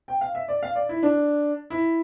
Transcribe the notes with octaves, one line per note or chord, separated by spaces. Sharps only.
G5
F5
E5
D5
F5
D5
E4
D4
E4